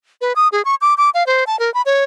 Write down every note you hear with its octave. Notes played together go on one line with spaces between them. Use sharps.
B4
D#6
G#4
C#6
D6
D6
F5
C5
A5
A#4
B5
C#5